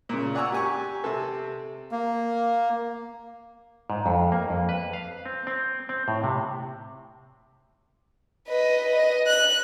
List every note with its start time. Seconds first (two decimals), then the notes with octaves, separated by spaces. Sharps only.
0.09 A#2 C#3
0.35 D5 F#5 G#5 A#5 C#6 E6
0.52 G4 G#5 C#6
1.04 C3 C4 A4
1.92 A#3
3.90 G#2
4.06 F2
4.32 A#3
4.50 F2
4.69 B4
4.93 F5
5.26 C4
5.47 C4
5.89 C4
6.08 A2
6.24 C3
8.48 B4 D#5
8.96 D#5
9.27 F#6